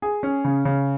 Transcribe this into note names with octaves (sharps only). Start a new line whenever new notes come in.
G#4
C#4
C#3
C#3